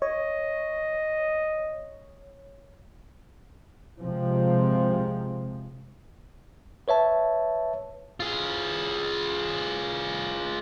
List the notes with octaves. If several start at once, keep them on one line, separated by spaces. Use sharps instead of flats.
C#5 D#5
C3 F3 G#3 C4
B4 C#5 E5 A5
F4 G#4